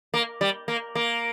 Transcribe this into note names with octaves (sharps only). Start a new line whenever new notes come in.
A#3
G3
A#3
A#3